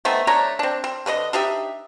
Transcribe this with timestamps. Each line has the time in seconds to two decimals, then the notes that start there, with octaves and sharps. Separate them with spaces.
0.05 A3 B3 C4 D#4
0.27 A3 D4 C#5 A#5
0.59 C4 D4
0.84 C4
1.06 D3 B4 D5 D#5
1.33 D4 D#4 G4 E5